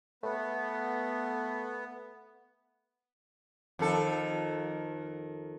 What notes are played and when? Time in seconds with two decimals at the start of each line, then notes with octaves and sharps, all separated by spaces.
0.23 A3 B3
3.79 F2 D#3 A4